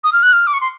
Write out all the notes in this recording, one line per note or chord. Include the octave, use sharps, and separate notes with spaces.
D#6
F6
F#6
F6
D6
C#6
C6